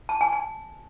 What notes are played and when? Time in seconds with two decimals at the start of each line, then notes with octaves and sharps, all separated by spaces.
0.09 A5
0.21 G#5
0.33 G#5